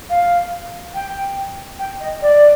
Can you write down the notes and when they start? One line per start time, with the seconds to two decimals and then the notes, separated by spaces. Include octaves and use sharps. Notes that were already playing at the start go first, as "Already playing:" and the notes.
0.10 F5
0.95 G5
1.79 G5
2.00 D#5
2.22 D5